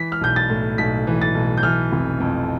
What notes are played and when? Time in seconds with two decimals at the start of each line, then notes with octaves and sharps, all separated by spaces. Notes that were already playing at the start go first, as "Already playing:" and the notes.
Already playing: E3 B6
0.12 F6
0.21 B1 G6
0.36 A6
0.50 A2
0.78 B1 B6
1.07 E3
1.21 A6
1.35 B1
1.57 G6
1.63 E3 F6
1.92 F1
2.20 F2